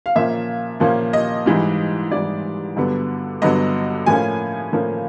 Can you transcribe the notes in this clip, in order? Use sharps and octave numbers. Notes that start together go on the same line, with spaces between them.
F5
A#2 F3 A#3 C#4 E5
A#2 F3 A#3 C#4
D#5
G#2 E3 G3
G#2 E3 G3 D5
G2 D3 F#3 B3
G2 D3 F#3 B3 D#5
A2 F3 A#3 C#4 G#5
A2 F3 A#3 C#4